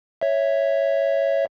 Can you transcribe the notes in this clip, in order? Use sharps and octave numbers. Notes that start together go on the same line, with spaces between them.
C#5 E5